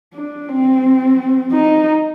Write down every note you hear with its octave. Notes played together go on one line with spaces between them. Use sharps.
D4
C4
D#4